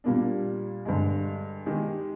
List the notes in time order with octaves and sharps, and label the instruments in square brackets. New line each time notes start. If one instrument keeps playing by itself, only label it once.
[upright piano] A#2 G3 A#3 D4
G2 D3 G#3
D#3 G#3 D#4 G4